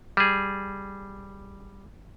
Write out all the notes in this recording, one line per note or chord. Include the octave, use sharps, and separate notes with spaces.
G3 G#4